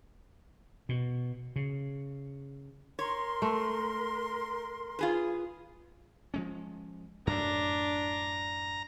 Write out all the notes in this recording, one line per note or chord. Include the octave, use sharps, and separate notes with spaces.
B2
C#3
A#4 C#5 C6
A3
F4 G#4 B4
F3 G#3 C#4
F#2 A2 D4 A#5